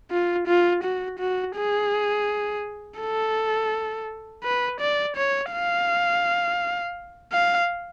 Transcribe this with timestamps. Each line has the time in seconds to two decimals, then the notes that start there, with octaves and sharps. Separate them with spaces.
0.11 F4
0.48 F4
0.83 F#4
1.19 F#4
1.56 G#4
3.00 A4
4.44 B4
4.81 D5
5.16 C#5
5.52 F5
7.32 F5